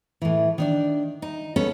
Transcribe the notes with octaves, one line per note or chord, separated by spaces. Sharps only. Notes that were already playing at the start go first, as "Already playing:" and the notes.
A2 E3
D#3 D4 D5
D#4
B3 C#4 A4